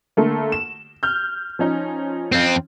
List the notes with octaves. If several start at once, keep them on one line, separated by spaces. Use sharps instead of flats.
D3 A3 A#3
E7
F6 G6
F3 C#4 D#4
F2 C4